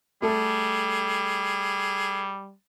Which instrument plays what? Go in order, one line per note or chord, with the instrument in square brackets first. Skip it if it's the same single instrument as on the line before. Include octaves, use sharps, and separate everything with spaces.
[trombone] G3 [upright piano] A3 A4 [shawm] G#4